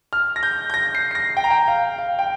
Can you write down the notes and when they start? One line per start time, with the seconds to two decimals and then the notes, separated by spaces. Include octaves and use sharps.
0.13 F6
0.36 A#6
0.43 G6
0.70 G6
0.74 A#6
0.95 C7
1.11 C7
1.15 A#6
1.37 G5
1.44 A#5
1.50 G5
1.68 F5
1.98 F5
2.19 G5